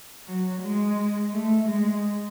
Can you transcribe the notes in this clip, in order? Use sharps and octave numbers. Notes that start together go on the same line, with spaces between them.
F#3
G#3
A3
G#3